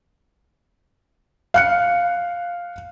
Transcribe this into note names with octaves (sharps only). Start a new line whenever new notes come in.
F5 F#6 C#7